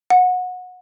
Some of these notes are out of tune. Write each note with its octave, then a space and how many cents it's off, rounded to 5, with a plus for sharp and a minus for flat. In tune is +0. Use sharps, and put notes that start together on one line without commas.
F#5 -25